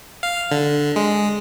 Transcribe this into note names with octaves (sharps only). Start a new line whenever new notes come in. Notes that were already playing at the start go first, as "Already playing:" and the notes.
F5
D3
G#3